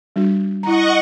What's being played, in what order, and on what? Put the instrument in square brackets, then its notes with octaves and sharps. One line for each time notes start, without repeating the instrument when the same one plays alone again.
[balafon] G3 D4 F#4
[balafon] E4 A#5 [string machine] D#5 F#5 C#6